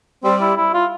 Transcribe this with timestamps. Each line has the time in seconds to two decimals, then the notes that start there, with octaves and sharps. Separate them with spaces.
0.24 G3 C4
0.41 E4
0.57 E4
0.74 F4